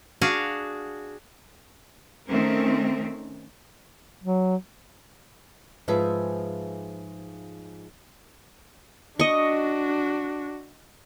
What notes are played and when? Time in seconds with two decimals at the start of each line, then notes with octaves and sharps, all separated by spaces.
0.21 D4 F#4 G#4 F5
2.28 D#3 A3 C4 C#4 A#4
4.23 F#3
5.88 G#2 F3 G#4 B4 E5
9.20 D4 F#4 D#5 C#6